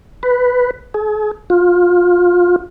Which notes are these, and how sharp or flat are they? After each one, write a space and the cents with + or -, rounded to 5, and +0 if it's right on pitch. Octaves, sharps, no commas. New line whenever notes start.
B4 +5
G#4 +45
F4 +20